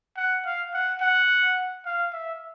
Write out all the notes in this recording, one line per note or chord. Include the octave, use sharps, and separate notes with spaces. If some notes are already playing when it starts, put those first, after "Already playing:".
F#5
F5
F#5
F#5
F5
E5